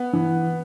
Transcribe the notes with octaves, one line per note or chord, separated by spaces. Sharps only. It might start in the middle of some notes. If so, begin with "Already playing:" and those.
Already playing: B3
E3